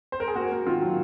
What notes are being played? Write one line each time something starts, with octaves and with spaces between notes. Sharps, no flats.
C5
A#4
G#4
A#3 F#4
A#3
D#3 F4
F#3